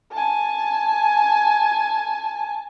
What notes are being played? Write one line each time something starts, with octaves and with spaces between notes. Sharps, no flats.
G#5 A5